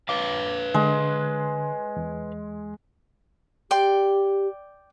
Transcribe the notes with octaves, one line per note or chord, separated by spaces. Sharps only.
B4 C#5 F5 D6
D3 G#3
E2
G4 D5 G5 C6